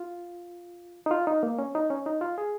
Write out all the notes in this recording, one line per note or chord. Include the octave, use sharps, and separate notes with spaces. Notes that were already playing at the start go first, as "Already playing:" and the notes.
Already playing: F4
D#4
F4
D#4
A#3
C#4
D#4
C#4
D#4
F4
G#4